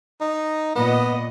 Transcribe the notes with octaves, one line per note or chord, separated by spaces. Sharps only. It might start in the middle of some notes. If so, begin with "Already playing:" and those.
D#4
A#2 B3 D#5